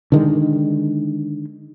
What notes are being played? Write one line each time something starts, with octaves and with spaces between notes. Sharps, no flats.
D3 D#3 G#3